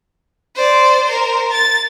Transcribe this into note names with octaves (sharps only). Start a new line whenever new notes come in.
C5 D5
A#4 C5
A6